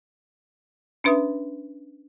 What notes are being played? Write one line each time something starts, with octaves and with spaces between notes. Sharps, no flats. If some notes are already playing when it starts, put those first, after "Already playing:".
C#4 D4 B4 E5 D#6